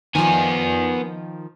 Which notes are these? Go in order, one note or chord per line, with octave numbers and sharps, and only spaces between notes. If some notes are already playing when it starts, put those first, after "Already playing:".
D#3 F3 B3 G#5